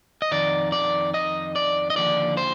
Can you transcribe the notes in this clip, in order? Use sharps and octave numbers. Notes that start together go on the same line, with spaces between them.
D#5
F2 D#3 D5
D5
D#5
D5
D#5
D#2 D3 F3 D5
C5